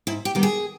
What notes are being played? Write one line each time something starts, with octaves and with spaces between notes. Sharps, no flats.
G#2 E4
G4
D#3 G3 B3
G#4